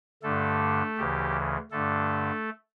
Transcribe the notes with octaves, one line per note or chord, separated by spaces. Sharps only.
G2 D3 A3 A4
D2 C#3 E3 G4
G2 D3 A3 A4